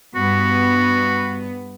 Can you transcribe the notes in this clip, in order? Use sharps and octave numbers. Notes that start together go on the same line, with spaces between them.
G2 B3 F#4